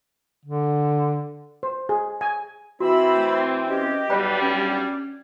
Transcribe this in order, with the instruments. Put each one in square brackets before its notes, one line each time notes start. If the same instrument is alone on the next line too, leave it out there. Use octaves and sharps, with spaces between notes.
[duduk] D3
[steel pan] C5
G#4
G#5
[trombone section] E3 C4 [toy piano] F#4 [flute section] E5 B5 E6
[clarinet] A3
[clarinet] C#4 [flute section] G4 D#5
[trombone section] B1 G3 [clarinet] B4 [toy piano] D5 G5 B5
[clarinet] C#4 [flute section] D4